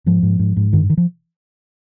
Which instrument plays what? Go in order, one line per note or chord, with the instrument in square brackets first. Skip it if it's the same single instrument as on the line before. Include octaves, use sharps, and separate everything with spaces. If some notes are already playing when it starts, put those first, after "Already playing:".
[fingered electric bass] G#2 F3
G#2
G#2
G#2
G2 D#3
D#3
F3